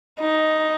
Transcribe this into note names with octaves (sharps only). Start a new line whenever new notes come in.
D#4